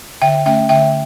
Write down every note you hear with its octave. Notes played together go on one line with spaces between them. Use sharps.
D3 E5 G5
A3 C#4 E5 G5
D3 E5 G5